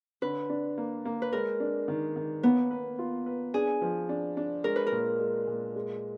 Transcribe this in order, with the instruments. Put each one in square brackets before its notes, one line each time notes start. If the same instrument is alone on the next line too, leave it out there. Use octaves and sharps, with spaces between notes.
[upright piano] D3 [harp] B4
[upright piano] D4
A#3
A#3
[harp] B4
[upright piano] G#3 [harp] A#4
[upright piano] D4
D#3
D#3
[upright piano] A#3 [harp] B3
[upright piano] B4
F4
B4
[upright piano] D4 [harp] G#4
[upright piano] F3
D4
D4
[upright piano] G#3 [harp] A#4
[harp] B4
A#4
[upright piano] A#2
G#3
A#2
G#3